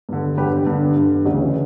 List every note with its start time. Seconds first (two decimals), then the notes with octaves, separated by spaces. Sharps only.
0.09 G2 D3
0.37 G2 D3 G4 B4
0.67 G2 D3
0.96 G2 D3
1.26 D2 C#3 E3